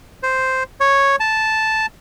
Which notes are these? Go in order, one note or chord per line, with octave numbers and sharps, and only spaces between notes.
C5
C#5
A5